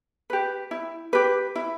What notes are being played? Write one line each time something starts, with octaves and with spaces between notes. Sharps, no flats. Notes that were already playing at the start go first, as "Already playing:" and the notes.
G4 B4
E4
G4 B4
E4